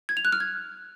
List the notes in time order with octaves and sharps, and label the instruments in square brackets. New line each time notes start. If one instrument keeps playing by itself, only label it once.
[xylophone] G#6
F7
F#6
F6
G#6